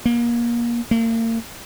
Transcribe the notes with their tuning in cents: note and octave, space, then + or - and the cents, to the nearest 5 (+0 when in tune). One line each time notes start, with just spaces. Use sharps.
A#3 +25
A#3 -40